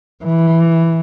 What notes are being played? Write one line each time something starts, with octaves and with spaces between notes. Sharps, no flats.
E3